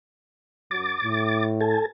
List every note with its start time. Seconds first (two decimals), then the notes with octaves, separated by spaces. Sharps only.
0.71 F#2 F#3 D6 A6
1.02 A2
1.61 A4 G#5 A5